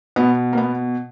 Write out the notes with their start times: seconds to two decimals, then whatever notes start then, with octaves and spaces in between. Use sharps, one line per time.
0.16 B2 B3
0.53 A#3
0.57 B3